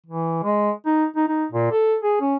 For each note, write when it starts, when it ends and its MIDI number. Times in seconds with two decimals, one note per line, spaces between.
0.06 0.43 52
0.44 0.71 56
0.86 1.05 63
1.16 1.28 63
1.28 1.45 63
1.52 1.68 46
1.72 1.96 69
2.03 2.19 68
2.21 2.36 61